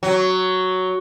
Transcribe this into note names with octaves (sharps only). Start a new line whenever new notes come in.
F#3